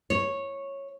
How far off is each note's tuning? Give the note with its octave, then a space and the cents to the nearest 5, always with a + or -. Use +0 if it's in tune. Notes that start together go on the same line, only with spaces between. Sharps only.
C#5 -10